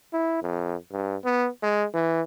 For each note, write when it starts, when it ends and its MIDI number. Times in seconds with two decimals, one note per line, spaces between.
0.13 0.39 64
0.42 0.75 41
0.92 1.16 43
1.25 1.48 59
1.63 1.86 56
1.94 2.21 52